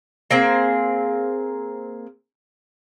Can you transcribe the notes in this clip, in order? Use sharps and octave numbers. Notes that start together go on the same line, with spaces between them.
A#3 C4 G#4